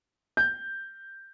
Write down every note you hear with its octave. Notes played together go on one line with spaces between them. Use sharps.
G6